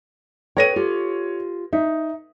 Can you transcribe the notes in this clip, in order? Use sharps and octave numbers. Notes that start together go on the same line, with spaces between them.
A4 B4 C#5 G5 A#6 D#7
F4 G4
D#4 E5